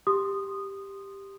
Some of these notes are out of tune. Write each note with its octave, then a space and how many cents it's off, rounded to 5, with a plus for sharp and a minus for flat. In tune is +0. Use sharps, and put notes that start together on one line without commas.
G4 +5 C6 +0 D#6 -15